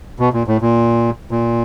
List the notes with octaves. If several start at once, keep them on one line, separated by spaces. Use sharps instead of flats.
B2
A#2
A2
A#2
A#2